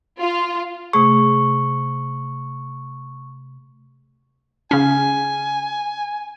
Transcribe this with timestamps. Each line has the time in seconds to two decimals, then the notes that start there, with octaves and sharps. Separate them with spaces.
0.19 F4
0.93 C3 A3 G#4 C#6
4.71 C#3 C#4 G#5